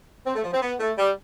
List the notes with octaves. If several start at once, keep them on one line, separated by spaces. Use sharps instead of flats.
C4
A3
F3
C4
B3
A3
G3